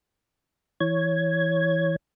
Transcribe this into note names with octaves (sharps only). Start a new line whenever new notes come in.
E3 C#5 G#6